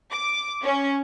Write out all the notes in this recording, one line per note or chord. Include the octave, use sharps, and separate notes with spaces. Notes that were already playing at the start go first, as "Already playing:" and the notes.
D6
C#4